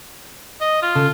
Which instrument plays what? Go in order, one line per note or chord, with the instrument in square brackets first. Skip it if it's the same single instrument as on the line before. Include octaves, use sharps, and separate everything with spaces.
[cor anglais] D#5
F4
[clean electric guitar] C#3 A4